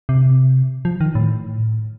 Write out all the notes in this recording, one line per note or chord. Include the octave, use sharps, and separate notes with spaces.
C3
F3
D#3
A2